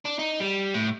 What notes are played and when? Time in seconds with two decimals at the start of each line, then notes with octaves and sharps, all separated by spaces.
0.05 D4
0.19 D#4
0.40 G3
0.74 A2